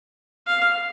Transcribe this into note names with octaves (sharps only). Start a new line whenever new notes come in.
F5